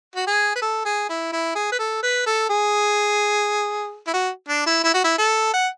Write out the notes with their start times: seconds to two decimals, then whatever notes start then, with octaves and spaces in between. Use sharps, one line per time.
0.16 F#4
0.27 G#4
0.56 B4
0.62 A4
0.85 G#4
1.09 E4
1.32 E4
1.55 G#4
1.72 B4
1.79 A4
2.03 B4
2.26 A4
2.49 G#4
4.07 E4
4.13 F#4
4.48 D4
4.66 E4
4.84 E4
4.94 F#4
5.04 E4
5.18 A4
5.53 F#5